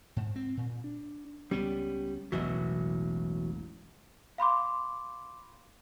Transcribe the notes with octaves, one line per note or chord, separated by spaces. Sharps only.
G#2
C4
A#2
D4
C#2 G3 B3 C#4
E1 A1 B2 E3 F#3
F5 B5 C6 D6